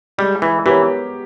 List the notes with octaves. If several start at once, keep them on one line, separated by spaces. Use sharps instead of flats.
G3 G#3
E3
E3 B3 G4 A#4 C#5